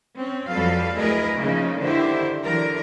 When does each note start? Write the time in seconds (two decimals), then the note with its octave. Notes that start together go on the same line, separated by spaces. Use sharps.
0.17 C4 C#4
0.49 F2 F#3 G3 A4 B4 F5
0.98 D2 E4 G#4 A#4 B4 D#5
1.37 C#3 F3 A#3 D#4
1.80 D3 D#3 E4 G4 C5 E5
2.45 D3 E3 F#3 A#4